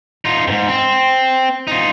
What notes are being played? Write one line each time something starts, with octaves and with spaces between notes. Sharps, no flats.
D#4 F4
F2 G#2
C4
D#4 F4